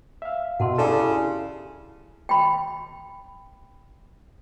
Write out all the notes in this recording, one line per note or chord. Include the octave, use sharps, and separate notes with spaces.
E5 F5
B2 F#5 A5 C6
C#3 D4 E4 G4 A4 D5 C6
G5 B5